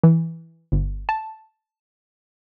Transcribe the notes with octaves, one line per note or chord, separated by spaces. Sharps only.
E3
G1
A5